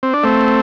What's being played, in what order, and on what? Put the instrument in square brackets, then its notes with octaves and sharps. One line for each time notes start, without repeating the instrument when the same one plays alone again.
[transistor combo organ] C4
D4
A3 C4